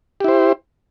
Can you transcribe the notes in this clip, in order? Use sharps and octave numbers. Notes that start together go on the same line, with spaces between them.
E4 G4 C5